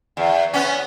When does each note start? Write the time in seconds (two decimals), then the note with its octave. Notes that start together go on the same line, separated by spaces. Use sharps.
0.17 E2
0.54 B3 C#4